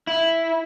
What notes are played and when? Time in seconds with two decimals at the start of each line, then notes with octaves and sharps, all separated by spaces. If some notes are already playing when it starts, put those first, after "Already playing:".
0.07 E4